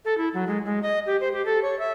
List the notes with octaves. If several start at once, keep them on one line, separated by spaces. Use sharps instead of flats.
A4
E4
F#3
G#3
G#3
D#5
G4
C5
G4
A4
C#5
E5